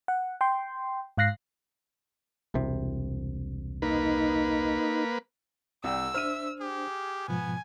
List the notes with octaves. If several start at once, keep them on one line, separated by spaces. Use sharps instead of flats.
F#5
G5 C6
G#2 F5 F#6 A#6 C7
E1 C2 C3
A#3 D#4 B4
C2 D5 G5 E6
D4 C5 E5 F6 D#7
G4 G#4
G#2 B2 F3 B3 G#5